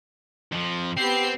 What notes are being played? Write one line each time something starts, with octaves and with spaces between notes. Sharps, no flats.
F2 F3
B3 C4 G4 C7